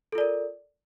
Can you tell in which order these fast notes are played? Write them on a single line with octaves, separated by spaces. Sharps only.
A4 F4 D5 A#4